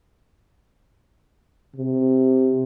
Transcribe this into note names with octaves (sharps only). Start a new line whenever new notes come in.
C3